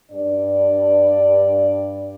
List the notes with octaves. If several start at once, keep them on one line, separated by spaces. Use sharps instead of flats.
G2 D4 D5